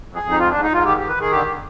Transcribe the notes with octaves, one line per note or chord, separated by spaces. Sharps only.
F2
G#4
F2
D#4
G#2 F4
G#2 D4
D#4
G#2 F4
D#3 G4
D#3 G4
B4
D#3 G#4
D3 G4
D3